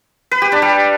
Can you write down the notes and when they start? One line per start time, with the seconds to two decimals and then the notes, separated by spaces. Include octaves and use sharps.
0.31 B4
0.42 G4
0.52 D4
0.62 G3